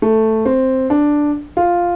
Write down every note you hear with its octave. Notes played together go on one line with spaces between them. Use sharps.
A3
C4
D4
F4